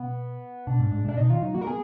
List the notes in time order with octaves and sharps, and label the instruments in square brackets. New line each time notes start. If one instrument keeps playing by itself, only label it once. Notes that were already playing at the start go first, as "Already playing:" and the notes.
Already playing: [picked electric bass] B2 [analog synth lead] B3
[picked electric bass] B2 [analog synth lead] D4
[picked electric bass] G#2
G#2
A#2
[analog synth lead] D4
[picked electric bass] B2 [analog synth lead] D#4
[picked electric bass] D#3 [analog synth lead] F4
[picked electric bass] F#3 [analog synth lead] D#4
[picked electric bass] A#3 [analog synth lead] F#4
[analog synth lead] A#4
[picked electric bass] B3 [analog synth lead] G#4